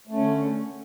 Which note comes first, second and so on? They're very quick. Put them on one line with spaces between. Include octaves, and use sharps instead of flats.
A3 C#4 D3